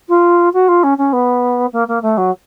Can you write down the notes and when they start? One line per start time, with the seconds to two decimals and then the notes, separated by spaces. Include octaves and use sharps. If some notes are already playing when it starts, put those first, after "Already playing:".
0.08 F4
0.53 F#4
0.68 F4
0.83 C#4
0.97 C#4
1.12 B3
1.72 A#3
1.88 A#3
2.02 A3
2.17 F#3